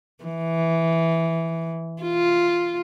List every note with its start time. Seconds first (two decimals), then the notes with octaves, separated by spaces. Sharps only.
0.24 E3
2.03 F4